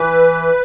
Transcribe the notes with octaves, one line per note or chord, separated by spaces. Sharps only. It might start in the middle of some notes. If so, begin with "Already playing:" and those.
Already playing: E3 B4